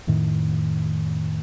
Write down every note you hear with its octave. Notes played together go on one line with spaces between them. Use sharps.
F2 A2 D#3